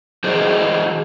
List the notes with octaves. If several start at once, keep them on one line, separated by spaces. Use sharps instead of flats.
E3 F#4 G#4 C5 D5 D#5